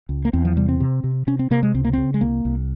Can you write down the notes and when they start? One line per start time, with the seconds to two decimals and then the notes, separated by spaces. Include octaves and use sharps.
0.09 C#2
0.25 A#3
0.33 E2 C4
0.45 F3
0.56 C3 G3
0.69 C4
0.80 C3
1.04 C3
1.27 C3 C#4
1.39 C4
1.51 C3 A#3
1.63 G#3
1.74 C#2 C4
1.85 A#3
1.93 C#3 C4
2.14 G#3
2.21 C2 A#3
2.45 C2